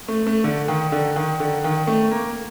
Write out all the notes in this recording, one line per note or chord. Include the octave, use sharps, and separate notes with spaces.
A3
A3
D3
D#3
D3
D#3
D3
D#3
A3
A#3